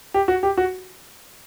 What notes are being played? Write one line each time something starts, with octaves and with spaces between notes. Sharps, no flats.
G4
F#4
G4
F#4